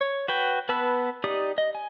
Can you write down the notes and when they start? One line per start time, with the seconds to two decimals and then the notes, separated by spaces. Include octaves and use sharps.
0.01 C#5
0.28 F#4 B4 G5
0.69 B3 B4 A5 B5 E6
1.24 D#4 G4 D5 D#6
1.58 D#5
1.75 G#5